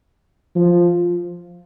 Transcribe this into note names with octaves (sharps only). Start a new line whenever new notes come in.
F3